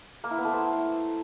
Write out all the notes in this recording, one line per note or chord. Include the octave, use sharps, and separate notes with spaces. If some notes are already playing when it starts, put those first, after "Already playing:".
A#3
E4
B3
A3
C5